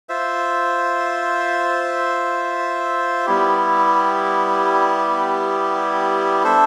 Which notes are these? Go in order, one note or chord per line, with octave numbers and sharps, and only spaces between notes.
F4 C5 E5
G3 B3 E4 G4
D4 A4 C5 E5